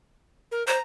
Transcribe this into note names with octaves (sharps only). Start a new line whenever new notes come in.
A#4
C5 A#5